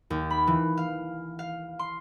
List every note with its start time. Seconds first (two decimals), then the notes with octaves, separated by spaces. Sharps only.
0.10 D#2
0.30 B5
0.47 E3
0.77 F5
1.39 F5
1.79 C6